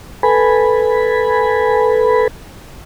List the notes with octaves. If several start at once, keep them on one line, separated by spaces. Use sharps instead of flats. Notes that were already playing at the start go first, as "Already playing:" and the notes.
A4 B4 G#5 B5